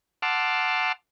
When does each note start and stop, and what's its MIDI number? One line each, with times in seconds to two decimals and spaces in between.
0.22 0.92 78
0.22 0.92 81
0.22 0.92 84
0.22 0.92 86
0.22 0.92 88
0.22 0.92 89